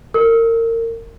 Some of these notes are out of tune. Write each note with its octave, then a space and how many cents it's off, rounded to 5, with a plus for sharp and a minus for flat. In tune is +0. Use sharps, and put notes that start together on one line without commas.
A#4 -30